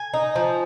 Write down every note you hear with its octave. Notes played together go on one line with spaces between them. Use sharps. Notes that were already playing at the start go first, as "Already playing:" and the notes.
Already playing: G#5
D#4
F3